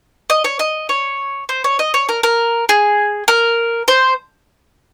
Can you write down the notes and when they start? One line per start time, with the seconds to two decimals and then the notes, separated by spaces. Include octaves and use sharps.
0.30 D#5
0.44 C#5
0.59 D#5
0.89 C#5
1.49 C5
1.64 C#5
1.79 D#5
1.94 C#5
2.09 A#4
2.23 A#4
2.69 G#4
3.28 A#4
3.88 C5